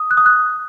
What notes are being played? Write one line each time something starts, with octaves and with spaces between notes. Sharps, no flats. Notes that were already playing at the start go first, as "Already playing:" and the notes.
Already playing: D#6
F#6
D#6
F#6